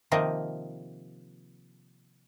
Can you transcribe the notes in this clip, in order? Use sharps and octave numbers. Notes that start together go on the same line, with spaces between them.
C3 D#3 F3 A#3 D#5